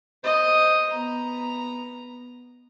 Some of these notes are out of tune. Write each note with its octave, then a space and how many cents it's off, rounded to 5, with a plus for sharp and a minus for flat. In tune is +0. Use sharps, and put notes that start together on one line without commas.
C5 +0 D#5 +0
B3 +0 A#5 +0